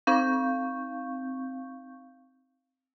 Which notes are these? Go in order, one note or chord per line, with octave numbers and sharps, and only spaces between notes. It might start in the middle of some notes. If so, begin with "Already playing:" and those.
C4 D#4 F5 C#6 G6